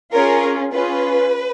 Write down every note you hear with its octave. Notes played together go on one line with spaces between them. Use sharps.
C#4 F4 G#4 A#4 C#5
C#4 F4 G#4 B4